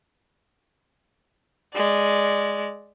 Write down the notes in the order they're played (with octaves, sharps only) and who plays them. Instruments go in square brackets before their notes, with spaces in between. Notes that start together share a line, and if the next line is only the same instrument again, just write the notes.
[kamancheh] G#3 D5